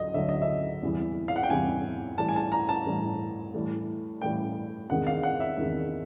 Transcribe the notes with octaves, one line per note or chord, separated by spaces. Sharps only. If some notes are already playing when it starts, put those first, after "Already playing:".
Already playing: D2 D3 F#3 D#5
D2 D3 F#3 E5
D#5
E5
E2 C3 E3 G3
F5
F#5
G5
E2 C3 E3 G3 G#5
A2 E3 G3 A5
G#5
A5
A#5
A5
A2 E3 G3
A2 E3 G3
A2 E3 G3 G5
E2 C3 D#3 G#3 F#5
F5
F#5
E5
E2 C3 D#3 G#3